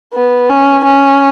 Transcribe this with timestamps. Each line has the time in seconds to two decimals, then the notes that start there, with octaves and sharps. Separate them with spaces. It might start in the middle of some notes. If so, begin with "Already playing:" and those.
0.14 B3
0.49 C#4
0.84 C#4